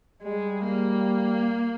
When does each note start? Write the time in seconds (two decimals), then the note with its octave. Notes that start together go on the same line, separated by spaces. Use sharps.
0.22 G3 G#3
0.64 A#3